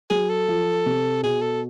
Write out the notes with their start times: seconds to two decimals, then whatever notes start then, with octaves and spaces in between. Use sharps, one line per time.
0.10 F#3 G#4
0.30 A4
0.48 F3
0.86 C3
1.23 B2 G#4
1.41 A4